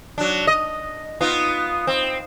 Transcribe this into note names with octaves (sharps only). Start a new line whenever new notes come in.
F#3 D4
D#5
B3 D#4 F4
C4